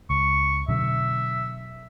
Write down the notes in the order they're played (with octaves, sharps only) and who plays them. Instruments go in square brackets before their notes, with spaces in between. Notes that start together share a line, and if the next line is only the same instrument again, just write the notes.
[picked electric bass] C#2 [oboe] C#6
[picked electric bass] B2 D3 F#3 [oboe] E5